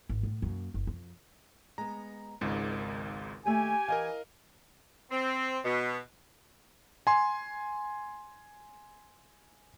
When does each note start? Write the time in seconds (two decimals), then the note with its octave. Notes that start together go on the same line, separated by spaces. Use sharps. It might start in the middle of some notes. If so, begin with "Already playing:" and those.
0.09 G#1
0.23 A2
0.42 F#2 A#3
0.74 F#1
0.87 F2
1.78 G#3 B3 A#5
2.41 G#1 C#2 G#2 D#3
3.46 D#2 A3 G4 E5 G#5
3.88 E3 A#4 D#5 F5
5.11 C4
5.64 B2
7.07 G#5 C6